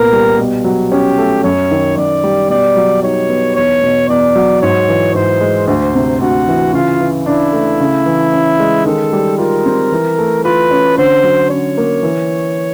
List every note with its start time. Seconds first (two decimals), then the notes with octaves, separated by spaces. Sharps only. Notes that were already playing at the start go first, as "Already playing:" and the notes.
Already playing: C2 A#2 B3 A#4
0.12 G3
0.38 B2
0.64 F#3
0.91 C#4 G4
1.18 A3
1.44 F#2 C#5
1.71 D#3
1.97 F#2 D5
2.24 G3
2.49 B2 D5
2.76 F#3
3.03 D#4 C#5
3.29 B3
3.56 E2 C#5
3.83 B2
4.09 E2 D5
4.36 F#3
4.62 G#2 C#5
4.89 E3
5.15 G#2 C5
5.41 G#3
5.67 D2 C5
5.95 C3
6.21 D2 F#4
6.48 E3
6.73 C#3 F4
7.00 E3
7.26 D4 E4
7.53 A3
7.80 C#3
8.06 E3
8.33 C#4
8.60 G#3
8.86 D#3 A4
9.13 G3
9.39 F4 A#4
9.66 C4
9.92 E3
10.18 A3
10.45 F4 B4
10.71 C#4
10.98 D3 C5
11.23 F#3
11.50 C#4 C#5
11.78 A#3
12.03 E3